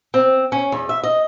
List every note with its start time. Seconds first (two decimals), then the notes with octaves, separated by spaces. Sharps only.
0.14 C4
0.52 C#4
0.72 E2
0.89 E5
1.03 D#5